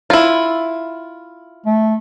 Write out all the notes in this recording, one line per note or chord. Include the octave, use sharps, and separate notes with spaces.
E4 F4
A3